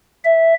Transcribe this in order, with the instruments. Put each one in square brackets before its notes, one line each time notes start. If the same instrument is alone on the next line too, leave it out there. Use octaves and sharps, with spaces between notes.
[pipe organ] E5